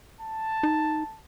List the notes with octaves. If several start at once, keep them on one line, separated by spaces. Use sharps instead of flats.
A5
D#4